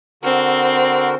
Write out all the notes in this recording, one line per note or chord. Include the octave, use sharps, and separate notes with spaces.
D3 C4 F#4 A#4